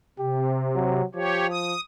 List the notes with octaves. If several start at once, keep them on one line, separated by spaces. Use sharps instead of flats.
C3 G4
F#3
F3 G4 C#5
D#6